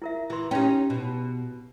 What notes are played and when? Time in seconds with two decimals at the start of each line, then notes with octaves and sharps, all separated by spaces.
0.02 E4 A#4 E5
0.30 E3 E4 C6
0.51 C#4 D#4 G4 C#5 G5
0.90 B2